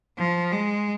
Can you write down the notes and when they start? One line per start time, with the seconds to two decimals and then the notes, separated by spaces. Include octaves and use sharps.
0.18 F3
0.52 G#3